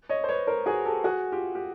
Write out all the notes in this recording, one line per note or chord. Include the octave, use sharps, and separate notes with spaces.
C#5 D#5
C5
B4 C#5
A#4 C5
F#4 G#4
G4 A4
F#4 G#4
F4 G4
G4